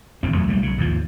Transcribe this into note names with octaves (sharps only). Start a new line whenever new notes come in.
D#1 E2 C4
E2 F#3 A3
B1 G3 A3 A#3
B1 C#3
D#2 G#2 F3